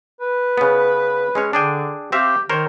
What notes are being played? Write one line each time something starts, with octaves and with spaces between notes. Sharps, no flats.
B4
C#3 B3
G#3 C#4 C#5
D3 D4 G#4 G5
C4 G4 E5 F5
D#3 A#4 C5 C#5